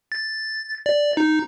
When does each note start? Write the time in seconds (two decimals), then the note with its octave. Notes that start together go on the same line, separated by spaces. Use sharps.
0.12 A6
0.86 D5
1.17 D#4